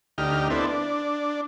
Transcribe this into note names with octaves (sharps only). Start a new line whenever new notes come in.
D2 D#4 G4 F6
B3 C4 D4 E4 A4
D4